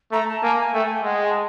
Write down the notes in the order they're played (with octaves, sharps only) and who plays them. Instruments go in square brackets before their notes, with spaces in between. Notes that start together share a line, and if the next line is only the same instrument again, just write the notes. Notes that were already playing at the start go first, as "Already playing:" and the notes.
[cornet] A3 [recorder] A#5
[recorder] A5
[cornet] A#3 [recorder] G#5
[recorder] G#5
[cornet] A3 [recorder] G5
[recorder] G#5
G5
[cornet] G#3 [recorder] F#5
[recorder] G5
G#5
A5